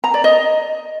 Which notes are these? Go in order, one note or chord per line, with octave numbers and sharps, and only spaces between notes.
A#5
D5
D#5